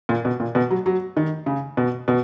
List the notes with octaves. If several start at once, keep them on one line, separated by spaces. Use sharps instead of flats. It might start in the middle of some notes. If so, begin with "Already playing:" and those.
A#2
B2
A#2
B2
F#3
F#3
D#3
C#3
B2
B2